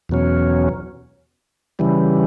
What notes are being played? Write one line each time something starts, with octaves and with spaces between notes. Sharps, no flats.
E2 B2 F#3 C#4
C#3 E3 G3